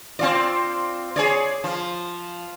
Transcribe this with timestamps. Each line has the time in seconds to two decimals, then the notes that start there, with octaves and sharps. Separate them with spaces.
0.19 C4 F4 D5
1.16 G#4 C#5 D5
1.64 F3